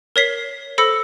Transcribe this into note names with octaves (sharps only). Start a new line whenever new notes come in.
A#4 C#5 B6 C7 G7
A4 C5 B5 E6 A#6 C#7